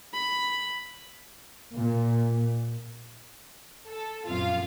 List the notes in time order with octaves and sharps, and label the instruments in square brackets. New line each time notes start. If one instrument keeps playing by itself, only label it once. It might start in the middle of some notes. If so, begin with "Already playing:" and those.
[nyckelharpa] B5
[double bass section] A#2
[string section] A4
A#1 F#2 C3 F4 F5